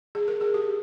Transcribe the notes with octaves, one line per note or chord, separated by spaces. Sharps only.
G#4
A#4
G#4
G4